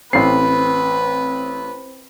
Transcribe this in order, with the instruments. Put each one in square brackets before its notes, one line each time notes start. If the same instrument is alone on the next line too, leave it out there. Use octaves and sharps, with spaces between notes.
[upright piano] A1 C7 [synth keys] C4 [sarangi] B4